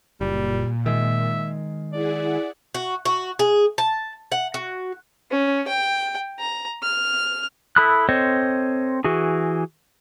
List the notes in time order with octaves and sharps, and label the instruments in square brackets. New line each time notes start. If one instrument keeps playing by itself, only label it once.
[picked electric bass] F#1 [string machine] A#2 [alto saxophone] G3
[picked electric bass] D#3 G#3 [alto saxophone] E5
[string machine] E4 G#4 F#5 [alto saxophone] D5
[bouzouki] F#4
F#4
G#4
A5
F#5
F#4
[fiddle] C#4
G5
A#5
F6
[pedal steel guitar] E4 A4 B5 D#6 F#6
C4 A4 C5 C#5 D#5
E3 F#4 G#4